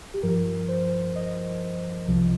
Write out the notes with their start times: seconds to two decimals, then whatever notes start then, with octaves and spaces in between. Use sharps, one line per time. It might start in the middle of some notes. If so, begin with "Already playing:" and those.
0.14 G4
0.23 G2 F3 A#4
0.68 C5
1.16 D#5
2.07 C2 C3 F3